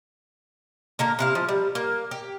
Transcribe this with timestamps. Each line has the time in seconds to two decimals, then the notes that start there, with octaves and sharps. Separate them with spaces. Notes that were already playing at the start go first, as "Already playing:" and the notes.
0.99 D3 A#3 A#4
1.19 C3 E4 F5
1.35 F3
1.49 G3
1.75 A#3
2.11 G4